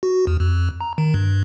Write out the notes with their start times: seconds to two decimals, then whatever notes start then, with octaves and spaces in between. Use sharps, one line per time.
0.03 F#4
0.27 E2
0.40 F2
0.81 A#5
0.98 D#3
1.14 G2